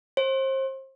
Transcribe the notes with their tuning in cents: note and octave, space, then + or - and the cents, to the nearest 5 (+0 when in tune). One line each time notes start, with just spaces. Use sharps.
C5 +30